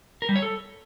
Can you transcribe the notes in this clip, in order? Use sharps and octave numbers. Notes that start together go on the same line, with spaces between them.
A#4
G3
C#5
A4